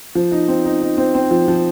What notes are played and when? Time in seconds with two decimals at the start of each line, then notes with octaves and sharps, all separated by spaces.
0.15 F3
0.32 D#4
0.48 C4
0.65 D#4
0.82 D#4
0.97 C4
1.15 C4
1.31 F3
1.48 F3